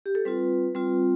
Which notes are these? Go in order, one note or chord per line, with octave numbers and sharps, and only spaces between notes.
G4
A4
G3 C4 F4 B4
G3 C4 F4